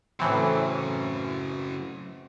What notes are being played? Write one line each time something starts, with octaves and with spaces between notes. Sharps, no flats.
A2 C#3 E3 F#3 C4